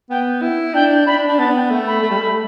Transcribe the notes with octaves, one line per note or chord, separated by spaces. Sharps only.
B3 G5
E4
D4 G5
D4 B5
D4
B3 A5
G5
A3
B5
A3
G3
A3